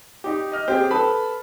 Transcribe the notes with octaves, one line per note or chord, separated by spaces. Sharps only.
D#4 G4
D#5 F6
C4 G4 G#4
A4 B4 A5 B5